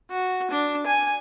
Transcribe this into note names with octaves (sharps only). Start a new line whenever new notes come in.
F#4
D4
G#5